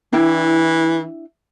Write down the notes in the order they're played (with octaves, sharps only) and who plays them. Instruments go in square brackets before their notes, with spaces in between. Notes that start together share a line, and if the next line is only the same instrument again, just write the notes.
[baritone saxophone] E3 [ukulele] D4 E4 G5